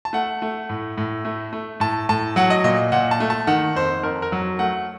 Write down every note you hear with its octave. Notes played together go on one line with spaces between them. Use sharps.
A5
A3 F#5
A3
A2
A2
A3
A3
A2 A5
A2 A5
F#3 F#5
D#5
A#2 D#5
A#2 F#5
A5
A3
A5
D#3 F#5
F2 C5
F2 A#4
A#4
F#3
A3 F#5